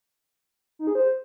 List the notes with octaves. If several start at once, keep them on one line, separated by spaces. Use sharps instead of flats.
D#4
G#4
C5